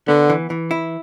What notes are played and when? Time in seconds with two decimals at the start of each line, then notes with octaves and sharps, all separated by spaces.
0.08 D3 B3
0.30 E3
0.50 E3
0.71 E4